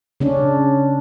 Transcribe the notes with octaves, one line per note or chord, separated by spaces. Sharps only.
C#3 C#4 D4